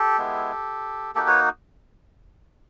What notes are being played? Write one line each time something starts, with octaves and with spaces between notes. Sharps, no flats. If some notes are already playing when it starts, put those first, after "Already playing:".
Already playing: G4 A4
G#3 B3 E4
A#3 D#4 F#4 G4 A4
B4 C#5